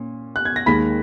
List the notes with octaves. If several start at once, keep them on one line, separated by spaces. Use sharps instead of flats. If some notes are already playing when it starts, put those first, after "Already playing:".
Already playing: A#2 C#4
F#6
G#6
A#6
D#2 D#3 G#3 B5 B6